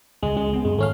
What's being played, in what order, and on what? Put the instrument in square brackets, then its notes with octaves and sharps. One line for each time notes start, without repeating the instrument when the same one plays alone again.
[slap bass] C#2 C#3 [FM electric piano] G#3
[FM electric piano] G#3 [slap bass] C#4
[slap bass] B3 C4
[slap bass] F#2 [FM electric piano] G#3
[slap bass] G#2 D#3 [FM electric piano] A3 C#4 F5